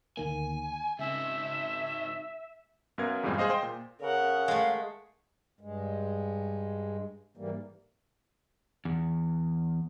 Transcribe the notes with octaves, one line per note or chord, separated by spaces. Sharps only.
D2 D#3 A#3 G#5
G#2 C#3 C4 E5
F#2 B3 A#4 F5 G#6
E2 G2 A#2 G3 G#3 C4
G#4 C5 D#5 F5
C5 G5
A#2
C#3 A#4 F#5
G#3 A3 F5
G2 G#3
G#2 E3 G3 A#3
E2